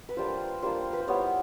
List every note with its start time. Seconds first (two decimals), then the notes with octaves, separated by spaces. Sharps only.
0.09 B4
0.17 G3 A#3 D4 F4 C5
0.62 G3 A#3 D4 F4 C5
0.93 B4
1.00 C5
1.07 G3 B3 E4 C#5